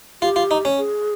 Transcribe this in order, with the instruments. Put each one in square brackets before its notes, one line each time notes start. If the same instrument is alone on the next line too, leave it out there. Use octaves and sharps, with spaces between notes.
[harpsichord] F4 [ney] G4
[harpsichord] F4
D#4
C#4
[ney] G#4